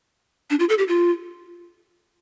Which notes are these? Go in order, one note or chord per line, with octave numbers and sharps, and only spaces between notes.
D4
F4
A4
G4
F4